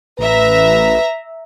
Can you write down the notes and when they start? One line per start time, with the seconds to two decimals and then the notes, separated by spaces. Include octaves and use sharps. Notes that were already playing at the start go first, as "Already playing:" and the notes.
0.19 A1 B4 E5 A#5